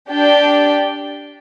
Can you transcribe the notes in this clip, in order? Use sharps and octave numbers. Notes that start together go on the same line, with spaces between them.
D4 G4 D5 G5